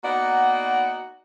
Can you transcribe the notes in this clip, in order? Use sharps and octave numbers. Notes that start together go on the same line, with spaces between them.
A#3 B3 D#4 F#4 D5 F#5